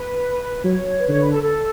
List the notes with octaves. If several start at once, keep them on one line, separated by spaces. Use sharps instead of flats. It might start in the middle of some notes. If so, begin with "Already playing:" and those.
Already playing: B4
F#3 C#5
B4
D3 C#5
B4
A4
A4